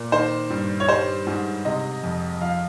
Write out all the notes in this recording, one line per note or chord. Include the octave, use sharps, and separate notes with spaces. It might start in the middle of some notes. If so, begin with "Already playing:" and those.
Already playing: A#2
D#3 C5
G2
C#5
G3 C5
G#2
C3 D#5
F2
F3 F5